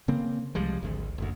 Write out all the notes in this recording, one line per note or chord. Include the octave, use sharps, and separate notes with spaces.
C#3 A#3 C4
C2 F3 G3 G#3
G#1 D2
F#1 D2